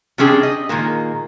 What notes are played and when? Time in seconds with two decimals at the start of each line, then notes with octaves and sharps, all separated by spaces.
0.18 C3 G3 C#4 D4 G#4 G5
0.43 D#5
0.69 A#2 D#3 G#3 A#3